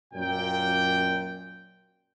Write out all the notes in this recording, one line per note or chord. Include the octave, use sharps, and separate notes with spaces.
F#2 A#2 G5